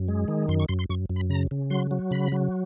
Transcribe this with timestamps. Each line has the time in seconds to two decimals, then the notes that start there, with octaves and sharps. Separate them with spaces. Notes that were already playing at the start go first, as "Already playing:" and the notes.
Already playing: F#2
0.08 G#3
0.28 D#3
0.48 F#2 C6
0.60 C#6
0.69 F#2 C6
0.79 C6
0.90 F#2 C#6
1.10 F#2
1.16 B5
1.30 C#3 A#5
1.51 C#3
1.70 F#3 C6
1.91 F#3
2.11 C#3 B5
2.32 F#3